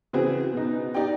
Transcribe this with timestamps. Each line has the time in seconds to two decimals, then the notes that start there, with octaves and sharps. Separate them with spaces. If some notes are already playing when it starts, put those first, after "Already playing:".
0.13 C#3 E3 C4 F#4 G#4
0.53 B2 D#4
0.94 D#4 G4 D5 G5